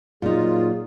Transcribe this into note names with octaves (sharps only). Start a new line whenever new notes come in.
A#2 F#3 A#3 D#4 F4 G#4